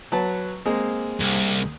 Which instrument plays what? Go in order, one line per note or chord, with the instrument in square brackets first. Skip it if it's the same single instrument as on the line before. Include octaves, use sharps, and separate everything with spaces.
[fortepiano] F#3 B4 A5
G#3 A#3 C4
[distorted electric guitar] C2